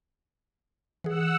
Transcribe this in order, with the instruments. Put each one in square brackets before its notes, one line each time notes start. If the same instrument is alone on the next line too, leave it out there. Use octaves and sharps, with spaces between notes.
[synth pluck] E3 G#4 [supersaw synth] F#5 E6